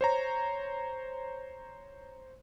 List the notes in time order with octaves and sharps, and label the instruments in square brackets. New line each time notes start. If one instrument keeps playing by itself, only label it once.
[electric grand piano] C5 C#5 A#5